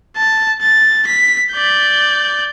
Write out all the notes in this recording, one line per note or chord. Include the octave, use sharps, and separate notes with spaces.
A5
A6
B6
D5 G6